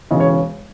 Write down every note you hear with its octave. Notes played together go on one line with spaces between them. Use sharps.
E1 E2 C#3 E3 D#5
C#5